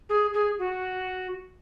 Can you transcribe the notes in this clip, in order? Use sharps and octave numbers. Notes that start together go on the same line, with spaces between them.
G#4
G#4
F#4